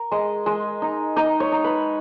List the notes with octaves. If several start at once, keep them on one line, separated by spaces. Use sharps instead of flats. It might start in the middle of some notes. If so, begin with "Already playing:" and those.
Already playing: A#4
G#3 D#5
G#3 D#5
D#4
D#4 D#5
C#5
D#4
B4